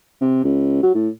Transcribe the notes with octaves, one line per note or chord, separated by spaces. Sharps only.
C3
C#2
F#3
A2